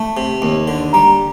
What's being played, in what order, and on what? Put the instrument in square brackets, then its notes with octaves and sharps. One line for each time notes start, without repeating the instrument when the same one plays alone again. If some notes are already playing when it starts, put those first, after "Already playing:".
Already playing: [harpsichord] A3 [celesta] A5
[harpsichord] C3
D#2
D3
[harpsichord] G3 [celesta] A#5